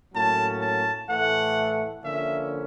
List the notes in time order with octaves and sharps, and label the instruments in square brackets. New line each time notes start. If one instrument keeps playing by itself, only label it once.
[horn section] A2 F#3 A#3 C#4 A5
A5
A2 E3 A3 F#5
D3 F3 A#3 C#4 E5